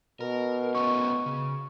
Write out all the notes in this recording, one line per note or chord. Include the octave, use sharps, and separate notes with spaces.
B2 A#4
A3 B3 C#4 C#6
C#3